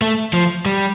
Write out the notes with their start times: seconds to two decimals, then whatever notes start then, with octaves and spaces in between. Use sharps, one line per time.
0.02 A3
0.33 F3
0.66 G3